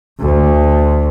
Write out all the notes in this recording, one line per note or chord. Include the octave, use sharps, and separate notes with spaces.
D2